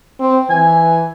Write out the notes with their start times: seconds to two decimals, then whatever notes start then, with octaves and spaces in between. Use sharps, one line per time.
0.20 C4
0.50 E3 G#5